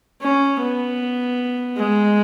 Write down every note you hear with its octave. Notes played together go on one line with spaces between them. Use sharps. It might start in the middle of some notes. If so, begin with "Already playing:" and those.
C#4
B3
G#3